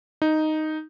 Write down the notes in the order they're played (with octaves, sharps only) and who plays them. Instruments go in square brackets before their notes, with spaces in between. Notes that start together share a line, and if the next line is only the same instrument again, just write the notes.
[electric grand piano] D#4